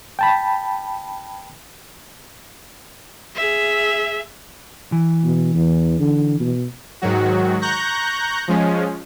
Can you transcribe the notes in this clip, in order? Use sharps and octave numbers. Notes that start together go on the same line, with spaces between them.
G5 A5 B5
G#4 E5
E3
B2
E2
D3
B2
G#2 D#3 F#3 F#4
A#5 C#6 F#6 G6 A#6
F3 G#3 C#4